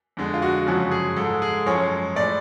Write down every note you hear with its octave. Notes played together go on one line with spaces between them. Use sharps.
F2 D3 G#3
F4
F#4
F#2 C#3 F3 G#3 F#4
G#4
G#2 G#3 A4
G#4
F#2 F3 G#3 C#5
A2 G#3 D5